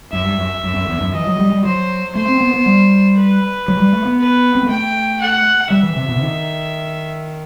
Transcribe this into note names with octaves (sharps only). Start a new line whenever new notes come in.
F#2 E5
G2
F#2
F#2
F#2
E2
F#2
E3 D#5
F#3
G3
G3
F#3 C5
A3 C5
C4
B3
B3
G3
B4
F#3
G3
A3
B3
B4
C4
B3
A3 G5
F#5
G3 E5
E3
C3
B2
C3
D#3